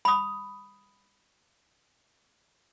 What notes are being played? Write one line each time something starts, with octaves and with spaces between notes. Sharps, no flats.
B5 D#6